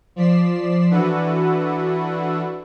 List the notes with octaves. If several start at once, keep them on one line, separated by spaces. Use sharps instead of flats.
F3 D5 B6 C7 E7
E3 D4 E4 F#4 A4 B4